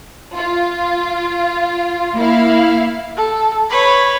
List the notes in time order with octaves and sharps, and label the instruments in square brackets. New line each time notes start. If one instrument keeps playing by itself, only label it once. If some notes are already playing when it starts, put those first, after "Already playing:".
[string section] F4
A#3 E4 F5
[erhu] A4
[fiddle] B4 C#5 [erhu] B5